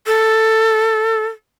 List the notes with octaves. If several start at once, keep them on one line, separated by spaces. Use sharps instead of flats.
A4